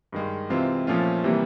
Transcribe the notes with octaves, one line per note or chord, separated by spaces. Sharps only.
G2 D#3 G#3
C3 E3 G#3 C4 F4
A#2 F3 A3 C#4 F4
C3 E3 G3 A#3